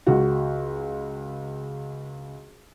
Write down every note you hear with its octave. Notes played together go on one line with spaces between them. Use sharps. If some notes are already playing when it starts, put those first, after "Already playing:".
C#2 F#4